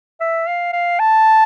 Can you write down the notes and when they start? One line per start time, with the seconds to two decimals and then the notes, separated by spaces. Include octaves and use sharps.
0.21 E5
0.47 F5
0.73 F5
1.00 A5